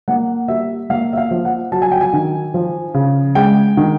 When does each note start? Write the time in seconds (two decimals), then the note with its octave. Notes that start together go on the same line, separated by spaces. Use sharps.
0.08 A#3 F#5
0.48 G3 E5
0.90 A#3 F5
1.13 E5
1.17 F5
1.31 F3
1.45 F#5
1.72 F#3 A5
1.82 G#5
1.92 G5
2.01 G#5
2.13 D#3
2.54 F3
2.94 C#3
3.35 G#3 G5
3.77 D#3